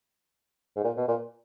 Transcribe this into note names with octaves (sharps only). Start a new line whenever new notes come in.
G#2
A#2
B2
A#2